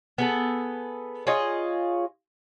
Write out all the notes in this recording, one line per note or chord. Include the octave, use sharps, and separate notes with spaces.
B3 G#4 A4
F4 G#4 C#5 D#5